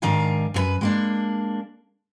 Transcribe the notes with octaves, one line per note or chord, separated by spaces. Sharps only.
G#2 D#3 D4 A#4 F5 G#5
F#2 F#4 B4
G#3 A#3 D4